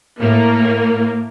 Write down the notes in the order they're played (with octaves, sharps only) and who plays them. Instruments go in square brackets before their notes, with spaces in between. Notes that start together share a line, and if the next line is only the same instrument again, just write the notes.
[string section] A2 A#3